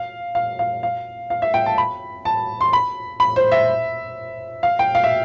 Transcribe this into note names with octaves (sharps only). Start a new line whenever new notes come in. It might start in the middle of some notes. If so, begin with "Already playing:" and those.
Already playing: F5
F5
F5
F5
F5
E5
G5
A5
B5
A5
C6
B5
B5
C5
E5
F5
G5
F5
E5